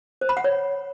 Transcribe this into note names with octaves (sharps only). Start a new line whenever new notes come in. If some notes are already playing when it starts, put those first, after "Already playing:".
C5
B5
F#5
C#5